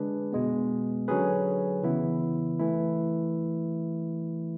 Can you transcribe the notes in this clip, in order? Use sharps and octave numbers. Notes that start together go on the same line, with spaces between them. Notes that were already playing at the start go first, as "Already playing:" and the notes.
Already playing: D3 G#3 D4 G#4 B4
B2 G#3 B3
D3 F#3 C#4 G#4 B4
C#3 E3 B3 E4
E3 A3 E4